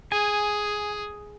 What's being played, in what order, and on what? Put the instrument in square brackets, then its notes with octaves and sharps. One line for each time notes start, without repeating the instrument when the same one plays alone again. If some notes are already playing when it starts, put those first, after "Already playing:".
[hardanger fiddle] G#4 [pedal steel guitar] G#5